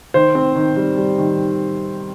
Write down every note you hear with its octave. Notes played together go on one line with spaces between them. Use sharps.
D#3 C5
C4
D#3
G3
G3
D#3